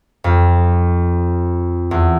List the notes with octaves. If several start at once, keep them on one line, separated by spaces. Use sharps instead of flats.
F2
E2